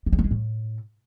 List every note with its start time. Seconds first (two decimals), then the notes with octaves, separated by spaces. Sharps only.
0.06 G3
0.13 G#3
0.19 A3
0.25 G#3
0.31 A2